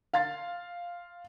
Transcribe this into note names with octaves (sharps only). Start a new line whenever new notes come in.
F5 C6 A6